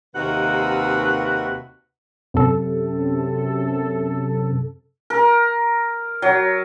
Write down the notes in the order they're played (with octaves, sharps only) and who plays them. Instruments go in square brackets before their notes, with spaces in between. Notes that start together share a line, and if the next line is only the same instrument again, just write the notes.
[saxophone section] D#2 C3 D#3 F#4 B4 F#5
[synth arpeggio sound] F#2 C3 A4
[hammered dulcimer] A#4
F#3